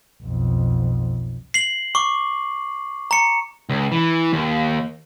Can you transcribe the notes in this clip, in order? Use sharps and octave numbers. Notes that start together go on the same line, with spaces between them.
B1 F2
C7 F#7
C#6 D6
A#5 C#7
C#2
E3
D#2